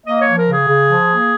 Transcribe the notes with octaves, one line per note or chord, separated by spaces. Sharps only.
A#3 D#5
C#5
F3
A#4
C#3 G#4
C#3
F3
A#3